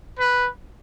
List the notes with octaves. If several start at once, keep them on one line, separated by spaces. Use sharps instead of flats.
B4